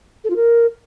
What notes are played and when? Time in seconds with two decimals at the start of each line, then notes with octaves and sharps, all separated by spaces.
0.24 A4
0.30 F4
0.36 A#4